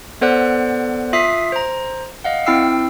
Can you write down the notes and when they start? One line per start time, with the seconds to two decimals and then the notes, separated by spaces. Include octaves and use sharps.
0.21 B3 A4 C5 D5 F#5 F#6
1.13 F4 E5 D#6 B6 C7
1.52 C5 A#5
2.24 D#5 F5 F#5
2.46 C4 E4 G5 E6 C7